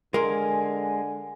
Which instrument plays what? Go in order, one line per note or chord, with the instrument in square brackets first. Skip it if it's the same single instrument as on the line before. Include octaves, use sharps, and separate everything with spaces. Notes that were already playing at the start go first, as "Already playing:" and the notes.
[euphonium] D3 [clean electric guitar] G#3 [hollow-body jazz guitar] A#4 C6 [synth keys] G#5